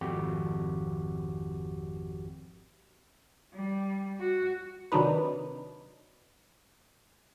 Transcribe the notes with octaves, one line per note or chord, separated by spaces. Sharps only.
G#1 F2 F#4 G4
G3
F#4
C3 D#3 F#3 D4 D#4 B4